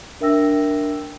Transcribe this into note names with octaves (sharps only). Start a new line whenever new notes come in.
D4 A#4 E5 G5 E6 A#6